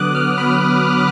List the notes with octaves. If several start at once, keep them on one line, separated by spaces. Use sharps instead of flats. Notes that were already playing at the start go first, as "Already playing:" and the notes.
Already playing: D3 F#3 B3 D6 D#6 F#6
F6
D3 F#3 B3 B5